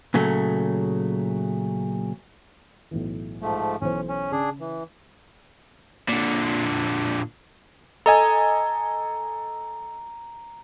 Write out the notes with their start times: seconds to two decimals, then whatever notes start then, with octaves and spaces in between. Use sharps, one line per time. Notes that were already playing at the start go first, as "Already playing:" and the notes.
0.14 A#2 C#3 F#3 A3
2.91 B1 A2 E3
3.42 G#2 F3 A3
3.81 B1 E3 C#4 C5
4.09 C#4
4.32 C#3 D4 G#4
4.60 E3
6.09 A#2 D3
8.06 A4 D#5 G#5 A#5